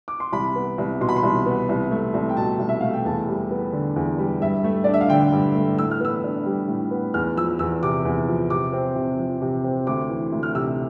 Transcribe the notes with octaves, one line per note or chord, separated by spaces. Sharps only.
D6
C6
C2 B5
B3
C2
B2 C6
B5
C6
C2
B3
C2
A3
C2
G5
B2 A5
C2
E5
A3 F5
G5
E2 A5
G3
B3
D3
E2
G3
G2 E5
A3
D4 D5
E5
F5
D3 G5
G2
A3
A2 E6
F6
B3 E6
D4
G3
A2
B3
E2 F6
F3 E6
E2 E6
C3 D6
E2
F3
C3 D6
C4
C3
F3
C3
C4
D2 D6
E3
D2
F6
C3 E6